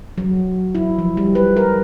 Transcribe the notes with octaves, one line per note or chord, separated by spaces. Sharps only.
F#3
E4
F3
G3
B4
A#4